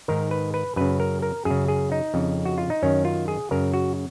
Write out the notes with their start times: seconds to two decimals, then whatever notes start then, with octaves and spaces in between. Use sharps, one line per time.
0.08 G#2 D#3 A#4
0.31 B4
0.54 B4
0.76 F#2 C#3 B4
1.00 A#4
1.22 A#4
1.45 F#2 G#4
1.50 C#3
1.68 G#4
1.92 D#4
2.14 F2 C#3
2.45 F#4
2.58 F4
2.70 D#4
2.82 F#2 D#3 C#4
3.05 F4
3.28 G#4
3.51 F#2 C#3 A#4
3.74 F#4